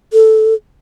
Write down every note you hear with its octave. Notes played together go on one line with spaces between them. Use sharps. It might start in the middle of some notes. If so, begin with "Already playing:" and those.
A4